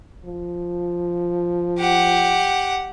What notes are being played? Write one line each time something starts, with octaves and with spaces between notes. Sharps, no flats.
F3
G4 F#5